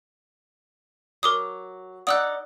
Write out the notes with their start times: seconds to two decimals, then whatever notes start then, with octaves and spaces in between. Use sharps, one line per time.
1.23 F#3 A#4 D6 D#6
2.07 D#4 D5 F#5 D#6 E6 F#6